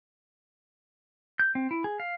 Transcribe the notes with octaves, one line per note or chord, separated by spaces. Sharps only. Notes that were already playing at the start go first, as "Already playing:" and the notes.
G6
C4
E4
G#4
F5